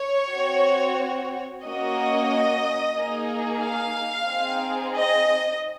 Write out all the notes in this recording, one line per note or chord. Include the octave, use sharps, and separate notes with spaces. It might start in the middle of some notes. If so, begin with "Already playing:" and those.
Already playing: C#5
C4 F#4
A#3 C#4 F#4 D#5
A#3 D#4 G#4
F5
C4 D#4 G#4
D#5